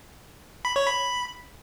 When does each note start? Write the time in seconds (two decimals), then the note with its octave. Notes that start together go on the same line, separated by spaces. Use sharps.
0.65 B5
0.76 C#5
0.87 B5